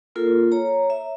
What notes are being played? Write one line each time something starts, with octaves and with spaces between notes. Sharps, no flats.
A#3 F4 A4 A#4
C#5 A#5
E5